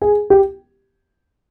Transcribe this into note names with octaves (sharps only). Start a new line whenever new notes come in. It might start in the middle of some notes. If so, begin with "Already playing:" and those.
G#4
G4